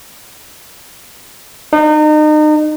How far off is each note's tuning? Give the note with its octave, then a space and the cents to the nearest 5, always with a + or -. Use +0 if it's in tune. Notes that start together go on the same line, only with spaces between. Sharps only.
D#4 -35